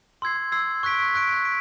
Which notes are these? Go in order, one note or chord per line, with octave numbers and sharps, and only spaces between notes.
C6 E6 G#6 C7
C6 E6 G#6 C7
C#6 F#6 B6 D7
C#6 F#6 B6 D7
F#6 B6 D7